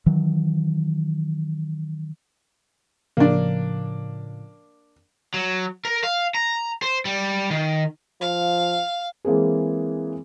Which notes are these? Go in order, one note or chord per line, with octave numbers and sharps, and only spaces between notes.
D#3 E3 F#3
A2 C#3 F3 A#3 D4
F#3
A#4
F5
A#5
C5
G3
D#3
F3 F5
E3 G#3 A#3 C4 G#4